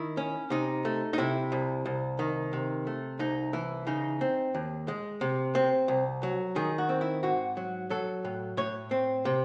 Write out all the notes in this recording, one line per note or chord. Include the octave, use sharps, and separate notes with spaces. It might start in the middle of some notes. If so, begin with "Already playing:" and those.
Already playing: D#3 E4
C#4
C3 D#4
A3
D#4
C3 E4
C2
C2
D#3
C3
A3
C2 D#4
E3 E4
C#3 D#4
C4
D#2
G#3
C3
C4
C2
F#3
D#3 G#4
F#4
C4
E4
G#2 F#4
F#3
F#3 A4
A2
A2 C#5
C4
C3